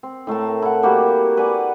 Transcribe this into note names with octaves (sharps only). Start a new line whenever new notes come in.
C4
A2 A3 A#4 A5
E4 F#5
G3 A#3 F#4 G4
B4 D5 F#5 G#5